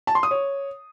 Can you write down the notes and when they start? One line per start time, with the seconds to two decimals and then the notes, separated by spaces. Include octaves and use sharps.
0.07 A5
0.15 C6
0.23 D#6
0.31 C#5